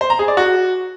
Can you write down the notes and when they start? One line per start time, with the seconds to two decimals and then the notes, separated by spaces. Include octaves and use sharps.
0.01 C5
0.10 A#5
0.19 G#4
0.28 D5
0.37 F#4